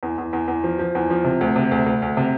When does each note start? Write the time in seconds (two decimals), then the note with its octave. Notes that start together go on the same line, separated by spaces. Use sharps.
0.03 E2
0.18 E2
0.33 E2
0.48 E2
0.64 F3
0.79 F3
0.95 E2
1.10 F3
1.24 C3
1.41 D2
1.56 C3
1.72 D2
1.86 D2
2.02 D2
2.17 C3